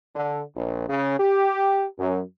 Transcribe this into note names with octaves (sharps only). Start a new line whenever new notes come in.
D3
A#1
C#3
G4
F#2